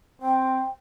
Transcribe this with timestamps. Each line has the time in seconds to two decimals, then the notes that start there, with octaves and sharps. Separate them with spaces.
0.22 C4 G5